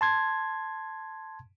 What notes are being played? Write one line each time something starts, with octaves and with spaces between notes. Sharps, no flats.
A5 C6 G#6